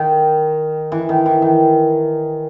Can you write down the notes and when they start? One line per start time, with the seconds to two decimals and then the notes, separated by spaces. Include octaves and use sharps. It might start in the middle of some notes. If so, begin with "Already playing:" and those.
Already playing: D#3
0.92 E3
1.09 D#3
1.26 E3
1.42 D#3